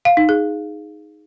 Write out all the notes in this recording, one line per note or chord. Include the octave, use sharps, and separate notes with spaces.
F5
D#4
G#4